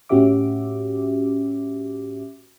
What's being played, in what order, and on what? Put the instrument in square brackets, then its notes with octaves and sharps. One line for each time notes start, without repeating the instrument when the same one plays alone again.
[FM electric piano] A2 C#4 F#4 G4 E5 D6